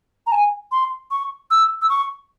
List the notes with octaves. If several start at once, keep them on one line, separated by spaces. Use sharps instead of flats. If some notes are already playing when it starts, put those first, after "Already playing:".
A#5
G#5
C6
C#6
E6
E6
C#6